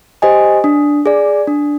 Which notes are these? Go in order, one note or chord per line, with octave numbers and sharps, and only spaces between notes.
G4 C5 D#5 G#5
D4
G#4 D5
D4